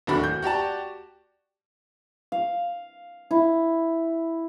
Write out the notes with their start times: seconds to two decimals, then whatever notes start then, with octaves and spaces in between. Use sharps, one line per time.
0.07 D1 D#2 A3 D4 F#4 B5
0.23 G6
0.42 F#4 G4 D5 A5
2.32 F5
3.31 E4